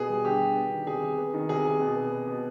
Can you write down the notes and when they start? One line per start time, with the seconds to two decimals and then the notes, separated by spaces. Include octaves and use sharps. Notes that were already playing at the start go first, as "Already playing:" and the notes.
Already playing: B2 B3 G#4
0.09 G3
0.25 D3 G4
0.40 D3
0.56 B3
0.71 D#3
0.87 C3 G#4
1.03 C3
1.18 B3
1.34 D#3
1.49 C3 G#4
1.65 C3
1.80 B2
1.96 B3
2.12 B3
2.27 B2